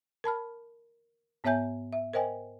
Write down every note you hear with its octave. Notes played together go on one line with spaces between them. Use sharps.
A#4 A5 B5 F6
G#2 B3 C#5 E5 G#5 G6
E5
A#4 C5 D#5 G5 G#5